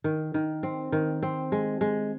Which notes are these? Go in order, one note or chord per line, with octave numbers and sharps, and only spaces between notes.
D#3
D#3
C4
D#3
C4
G#3
G#3